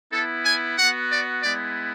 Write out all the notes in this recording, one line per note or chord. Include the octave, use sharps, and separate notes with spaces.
B3 E4 A4
G#5
B3 F#4 F#5
D5
G#3 B3 E4 D5